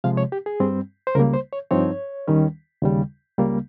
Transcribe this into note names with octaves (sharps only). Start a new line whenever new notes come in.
C3 F3 G#3 F5
C#5
G4
G#4
G2 G3 C4
C5
C#2 C#3 G3 A#3 A#4
C5
C#5
G2 F3 C4 D#4 C#5
D#2 D#3 G3 C#4
D#2 C#3 G3
C#2 C#3 G3 A#3